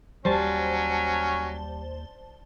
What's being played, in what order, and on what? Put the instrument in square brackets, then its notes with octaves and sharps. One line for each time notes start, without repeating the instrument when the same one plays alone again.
[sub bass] D#2 [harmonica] F#3 C#4 [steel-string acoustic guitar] G3 [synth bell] C5 A5